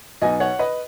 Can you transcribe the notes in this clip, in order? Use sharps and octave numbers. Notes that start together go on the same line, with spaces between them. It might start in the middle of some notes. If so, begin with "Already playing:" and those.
B1 B2 B3 D#4 D#5 G#5
C#5 F#5
B4 D#5